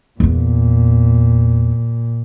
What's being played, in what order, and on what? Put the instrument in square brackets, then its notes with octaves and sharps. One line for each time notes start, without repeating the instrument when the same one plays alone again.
[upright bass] E2 B3 [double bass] A#2